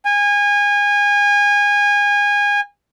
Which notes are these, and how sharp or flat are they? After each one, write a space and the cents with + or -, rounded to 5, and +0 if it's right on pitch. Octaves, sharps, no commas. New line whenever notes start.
G#5 -25